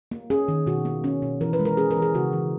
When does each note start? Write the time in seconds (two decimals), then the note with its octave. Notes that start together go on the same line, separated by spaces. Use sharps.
0.11 A#3
0.30 C#4 G#4
0.48 D#3
0.67 B2 F#4
0.85 A#3
1.04 C#4
1.22 B2
1.41 E3 A#4
1.53 B4
1.60 G#3
1.65 A#4
1.77 C#4 G#4
1.91 A#4
1.96 E3
2.02 G#4
2.14 C#3 F#4
2.33 E3